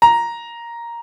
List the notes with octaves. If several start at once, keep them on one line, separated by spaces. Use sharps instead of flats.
A#5